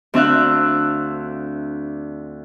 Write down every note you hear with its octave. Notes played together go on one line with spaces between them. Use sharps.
D2 C4 D4 E5 F5 F#6